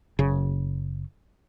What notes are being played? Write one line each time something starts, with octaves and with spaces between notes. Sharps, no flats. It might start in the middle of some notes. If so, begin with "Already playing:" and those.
F#1 C#3